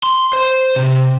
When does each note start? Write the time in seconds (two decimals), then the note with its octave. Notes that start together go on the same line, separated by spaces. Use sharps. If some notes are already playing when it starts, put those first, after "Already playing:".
0.03 C6
0.33 C5
0.76 C3